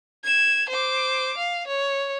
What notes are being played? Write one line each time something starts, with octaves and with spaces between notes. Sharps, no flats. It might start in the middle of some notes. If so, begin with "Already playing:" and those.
G#6 E7
C5 D6
F5
C#5